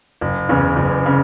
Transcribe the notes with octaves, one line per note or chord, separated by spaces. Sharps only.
F#1
E2 C#3
F#1
C#3